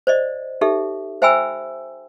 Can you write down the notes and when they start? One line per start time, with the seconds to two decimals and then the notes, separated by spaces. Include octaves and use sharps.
0.07 C5 D5 D#5
0.61 D#4 G4 A4 E5
1.22 C5 E5 G5 G#5 B5 E6